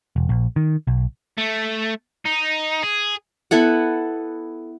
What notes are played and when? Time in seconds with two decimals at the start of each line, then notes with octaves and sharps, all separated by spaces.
0.16 E1
0.29 A#1
0.56 D#3
0.87 B1
1.38 A3
2.26 D#4
2.83 G#4
3.51 B3 E4 A4 F#5